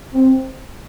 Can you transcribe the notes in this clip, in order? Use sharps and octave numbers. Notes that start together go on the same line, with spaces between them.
C4